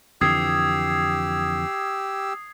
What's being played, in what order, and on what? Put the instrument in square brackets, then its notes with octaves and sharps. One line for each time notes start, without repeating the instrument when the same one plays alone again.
[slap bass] F2 D3 E3 [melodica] G4 E6 [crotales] D#6 G#6 C7